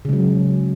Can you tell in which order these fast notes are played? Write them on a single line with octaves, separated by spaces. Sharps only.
C#3 G#3 F#3